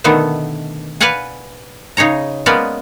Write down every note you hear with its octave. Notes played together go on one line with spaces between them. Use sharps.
B2 D3 D#3 A3 B3
B4 D5 F5 F#5 G#5
C#3 D#4 G#4 C#5 A#5
G#3 A#3 B3 C#4 B4 D5